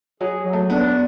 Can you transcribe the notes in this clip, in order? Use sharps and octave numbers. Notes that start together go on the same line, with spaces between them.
F#3 G#4
F#3
A3
B3 D4